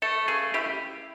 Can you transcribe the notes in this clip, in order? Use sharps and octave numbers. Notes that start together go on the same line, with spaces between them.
A3 A4
C#3 G#4
E4 G4